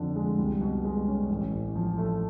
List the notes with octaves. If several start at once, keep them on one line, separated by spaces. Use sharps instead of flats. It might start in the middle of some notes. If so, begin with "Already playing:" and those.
Already playing: F2 D3 F3
G#3
C2
B2
G#3
C#4
A1
A2
F3
A3